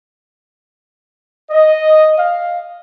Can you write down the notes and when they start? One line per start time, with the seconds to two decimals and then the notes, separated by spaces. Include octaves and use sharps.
1.50 D#5
2.17 F5